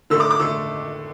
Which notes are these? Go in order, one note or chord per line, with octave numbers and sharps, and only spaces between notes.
D3 A3 E6
D6
D6
D3 A3 E6